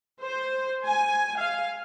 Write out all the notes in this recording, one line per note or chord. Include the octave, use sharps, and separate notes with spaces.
C5
G#5
F5